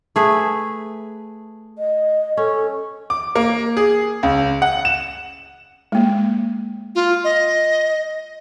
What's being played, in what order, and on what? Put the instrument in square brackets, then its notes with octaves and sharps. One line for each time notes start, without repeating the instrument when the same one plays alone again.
[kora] A3 G#4 B4
[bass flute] D#5
[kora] C#4 [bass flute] A4
[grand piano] D6
A#3
G#4
C#2
F#5
E7
[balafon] G#3 A#3
[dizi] F4
D#5